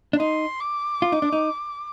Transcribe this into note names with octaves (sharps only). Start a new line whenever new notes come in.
D4
D#4 C6
D6
F4
D#4
D4
D#4